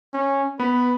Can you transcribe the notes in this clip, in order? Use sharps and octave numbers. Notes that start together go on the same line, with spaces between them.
C#4
B3 B4 B5